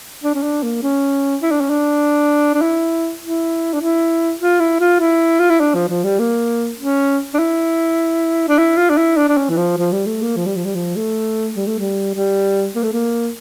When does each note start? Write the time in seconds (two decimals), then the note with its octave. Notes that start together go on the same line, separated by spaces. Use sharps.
0.23 D4
0.35 C#4
0.43 D4
0.63 A#3
0.83 C#4
1.42 E4
1.51 D4
1.61 C#4
1.70 D4
2.54 D4
2.61 E4
3.22 E4
3.73 D4
3.81 E4
4.41 F4
4.60 E4
4.80 F4
5.00 E4
5.39 F4
5.50 E4
5.60 D4
5.74 F3
5.89 F3
6.04 G3
6.19 A#3
6.79 C#4
7.34 D4
7.39 E4
8.48 D4
8.58 E4
8.77 F4
8.89 D4
8.97 E4
9.17 D4
9.28 D4
9.37 C#4
9.50 E3
9.57 F3
9.77 F3
9.92 G3
10.07 A3
10.22 A#3
10.37 F3
10.46 G3
10.56 F3
10.65 G3
10.75 F3
10.96 A3
11.56 G3
11.67 A3
11.78 G3
12.15 G3
12.75 A#3
12.83 A3
12.93 A#3